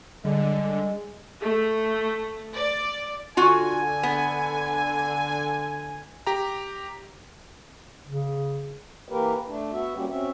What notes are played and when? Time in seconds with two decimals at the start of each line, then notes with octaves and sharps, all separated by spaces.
0.25 D3 G3 G#3
1.40 A3
2.55 D5
3.37 D3 F4 F#4 G#5
4.03 B3
6.27 G4 A#5
8.07 C#3
9.09 E3 A#3 G4 A#4 B4
9.47 A3 D4
9.72 B3 F#4 E5
9.95 G3 A#3 C#4 F#4 G4
10.10 C4 C#4 F#4 E5